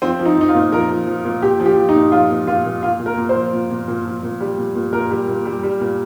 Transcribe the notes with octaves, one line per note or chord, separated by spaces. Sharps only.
F3 C4
F3
D#4
F3 D#4
F4
A#2
F3 A#4
F3
F3
A#2
A#2 G4
F3
G4
F3
D#4
A#2
F3 F4
A#2
A#2 F4
A#2
A#2 F4
A#2
A#4
A#2
C5
F3
A#2
A#2
A#2
F3
A#2
G3
A#2
A#2
A#2 A#4
G3
A#2
G3
G3
A#2